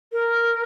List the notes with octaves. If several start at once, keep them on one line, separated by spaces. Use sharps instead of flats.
A#4